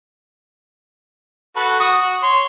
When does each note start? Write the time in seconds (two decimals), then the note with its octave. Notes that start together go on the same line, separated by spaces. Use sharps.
1.56 F#4 A4 B4
1.80 F#4 D#6
2.02 F#4
2.23 C#5 C6